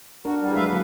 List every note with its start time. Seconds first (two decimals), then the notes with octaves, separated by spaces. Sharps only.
0.25 D4 F#4 A#4
0.41 E2 G3
0.56 F#3 G#3 B4 E5 F5
0.69 D3 F#3 A#3 G#4 F#5